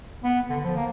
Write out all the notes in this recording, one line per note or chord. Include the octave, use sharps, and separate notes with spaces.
B3
D3
F3
A#3